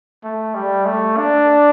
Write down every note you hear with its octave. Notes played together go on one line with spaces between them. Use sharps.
A3
G3
A3
D4